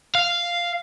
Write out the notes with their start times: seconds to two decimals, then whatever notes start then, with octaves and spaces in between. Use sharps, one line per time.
0.15 F5